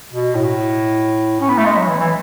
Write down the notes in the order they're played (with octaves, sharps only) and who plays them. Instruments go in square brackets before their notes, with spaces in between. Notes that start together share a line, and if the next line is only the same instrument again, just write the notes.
[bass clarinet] B2
A2
C#4
B3
A3
G#3
F#3
E3
E3